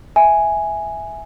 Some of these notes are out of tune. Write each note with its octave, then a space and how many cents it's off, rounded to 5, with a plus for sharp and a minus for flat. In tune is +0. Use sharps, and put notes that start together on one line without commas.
E5 +0 G#5 +0